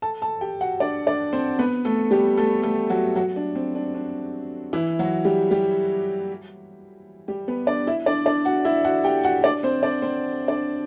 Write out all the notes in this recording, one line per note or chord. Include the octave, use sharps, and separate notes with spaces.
A4 A5
A4 A5
G4 G5
F#4 F#5
D4 D5
D4 D5
C4 C5
B3 B4
A3 A4
G3 G4
A3 A4
A3 A4
F#3 F#4
F#3 F#4
D4
C4
D4
D4
E3 E4
F#3 F#4
G3 G4
G3 G4
G3 G4
B3 B4
D4 D5
E4 E5
D4 D5
D4 D5
F#4 F#5
E4 E5
F#4 F#5
G4 G5
F#4 F#5
D4 D5
C4 C5
D4 D5
C4 C5
D4 D5